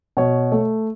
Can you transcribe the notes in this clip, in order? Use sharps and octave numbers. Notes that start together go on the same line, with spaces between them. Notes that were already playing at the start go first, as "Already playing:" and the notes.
B2 C#5
A3